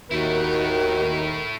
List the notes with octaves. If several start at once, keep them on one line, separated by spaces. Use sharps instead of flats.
D#2 D#3 A3 E4 F#4 A#4